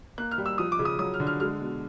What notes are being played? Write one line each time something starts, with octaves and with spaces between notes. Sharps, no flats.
A#3 F#6
F6
G3
E6
F3 D#6
D6
C#3
D#6
F#3 D#6
F6
D3
F6
G#3 F6
B2